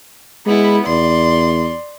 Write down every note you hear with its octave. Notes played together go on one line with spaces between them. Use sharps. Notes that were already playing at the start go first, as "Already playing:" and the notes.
G#3 B3 E4
E2 D5 C6